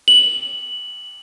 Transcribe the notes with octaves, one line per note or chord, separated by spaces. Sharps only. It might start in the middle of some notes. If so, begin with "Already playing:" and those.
F#7